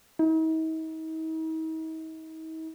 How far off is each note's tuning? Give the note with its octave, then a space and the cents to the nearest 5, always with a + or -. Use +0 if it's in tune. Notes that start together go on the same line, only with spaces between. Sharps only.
D#4 +45